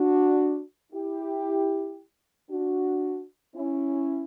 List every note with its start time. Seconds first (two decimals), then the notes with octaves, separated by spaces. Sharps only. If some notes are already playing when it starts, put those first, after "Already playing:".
Already playing: D4 F#4
0.92 E4 G4
2.50 D4 F#4
3.55 C#4 E4